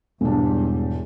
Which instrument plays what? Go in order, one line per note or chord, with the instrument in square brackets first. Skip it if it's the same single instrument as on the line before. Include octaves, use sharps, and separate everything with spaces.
[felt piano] E1 G#2 D4 [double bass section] E2 G3